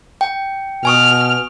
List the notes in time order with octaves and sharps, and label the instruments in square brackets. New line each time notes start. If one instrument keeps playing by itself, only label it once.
[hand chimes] G5
[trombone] B2 [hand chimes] G#5 C#6 D#6 [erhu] F6